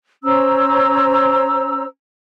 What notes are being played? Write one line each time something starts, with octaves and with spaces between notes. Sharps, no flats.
C#4 C5 A#5 E6